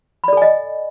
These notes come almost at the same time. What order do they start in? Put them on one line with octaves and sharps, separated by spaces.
B5 D5 A4 G#5 D#5